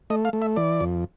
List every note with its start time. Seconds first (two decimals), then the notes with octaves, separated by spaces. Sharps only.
0.10 A3 D#5
0.25 F5
0.33 A3
0.42 E5
0.56 E3 D5
0.80 F2